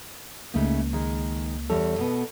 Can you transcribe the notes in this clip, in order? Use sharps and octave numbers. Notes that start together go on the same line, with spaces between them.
C#2 C#3 A3 A#3 D#4
D#3 G#3
E2 G3 A4 C#5
B2 B3